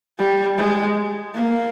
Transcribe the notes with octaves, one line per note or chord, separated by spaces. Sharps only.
G3
G#3
A#3